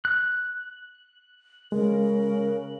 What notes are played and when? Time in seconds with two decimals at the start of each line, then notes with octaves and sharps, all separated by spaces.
0.05 F#6
1.72 C#3 G#3 A#4